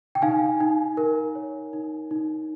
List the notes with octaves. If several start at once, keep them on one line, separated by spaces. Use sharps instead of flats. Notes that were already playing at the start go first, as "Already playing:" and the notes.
G5
D#4 F5 G#5
D#4
A#4
C#5
D#4
D#4